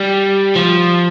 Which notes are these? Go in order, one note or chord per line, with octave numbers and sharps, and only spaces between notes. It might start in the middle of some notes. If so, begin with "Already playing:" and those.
Already playing: G3
F3